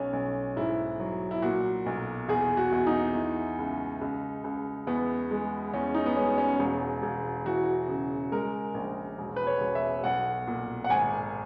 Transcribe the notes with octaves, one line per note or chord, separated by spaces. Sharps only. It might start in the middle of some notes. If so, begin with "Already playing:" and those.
Already playing: B1 C#4
B1
G#2 E4
F#3
E4
A#2 F#4
B1
E2 G#4
F#4
E2
D#4
E3
C#2
C#2
C#2
E2 B3
G#3
E2 C#4
D#4
B3
G#3 C#4
C#4
E1
E1
E3 F#4
C#3
G#3 A#4
A#1
E1
B4
C#5
E1
E5
B1 F#5
A#2
F#5
G#1 G#5